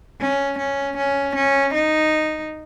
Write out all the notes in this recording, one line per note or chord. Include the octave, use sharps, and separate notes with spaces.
C#4
C#4
C#4
C#4
D#4